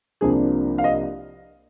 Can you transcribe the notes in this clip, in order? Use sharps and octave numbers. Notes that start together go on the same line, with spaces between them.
C2 C3 F3 A#3 D4 G#4
F5
D#5